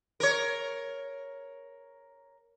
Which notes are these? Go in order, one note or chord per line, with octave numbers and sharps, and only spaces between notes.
A#4 C#5